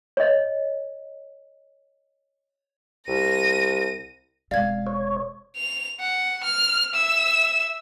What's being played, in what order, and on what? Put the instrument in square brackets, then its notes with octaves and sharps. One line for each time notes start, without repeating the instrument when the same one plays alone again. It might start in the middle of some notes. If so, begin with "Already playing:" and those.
[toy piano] C#5 D#5
[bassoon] C2 [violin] A#6 D#7
[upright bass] E1 C3 [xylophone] D5 G#6 [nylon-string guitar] F5
[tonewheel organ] C#5
[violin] F7
F#5
F6
E5 E6